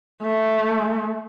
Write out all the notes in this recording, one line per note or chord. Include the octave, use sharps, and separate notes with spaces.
A3